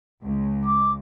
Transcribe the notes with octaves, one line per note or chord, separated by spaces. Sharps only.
C#2
D6